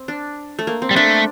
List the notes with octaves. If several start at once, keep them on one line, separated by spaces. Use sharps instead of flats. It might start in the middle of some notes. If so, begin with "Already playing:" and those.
Already playing: C4
D4
A3
A#3
C4
G3
A3 D4